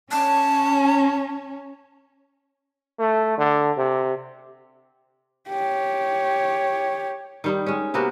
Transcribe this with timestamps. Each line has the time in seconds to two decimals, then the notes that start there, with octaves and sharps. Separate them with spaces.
0.12 C#4 A5
2.99 A3
3.38 D3
3.77 C3
5.49 G4 C#5
7.44 D#3 G3 D#4
7.66 G#3 C#4
7.94 C3 A#3 B3 F#4